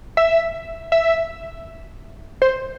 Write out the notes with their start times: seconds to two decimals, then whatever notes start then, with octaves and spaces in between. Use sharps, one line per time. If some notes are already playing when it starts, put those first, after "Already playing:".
0.17 E5
0.92 E5
2.42 C5